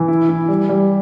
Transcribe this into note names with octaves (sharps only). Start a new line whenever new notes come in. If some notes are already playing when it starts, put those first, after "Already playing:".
Already playing: E3
E4
E4
G3
G3